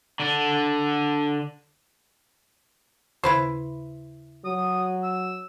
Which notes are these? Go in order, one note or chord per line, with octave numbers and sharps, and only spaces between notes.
D3 D4
D#2 C#3 E4 B4 C5
F#3 D#6
E6